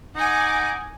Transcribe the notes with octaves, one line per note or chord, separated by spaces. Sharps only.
D#4 F#5 G#5 D6